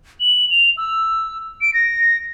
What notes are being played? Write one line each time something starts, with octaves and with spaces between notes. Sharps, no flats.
F#7
F7
E6
D7
A#6